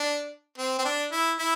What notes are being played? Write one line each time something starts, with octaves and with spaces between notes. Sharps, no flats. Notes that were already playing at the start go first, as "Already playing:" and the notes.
Already playing: D4
C4
C4
D4
E4
E4